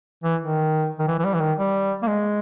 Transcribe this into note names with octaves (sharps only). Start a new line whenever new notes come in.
E3
D#3
D#3
E3
E3
G3
E3
D#3
G3
A#3
G#3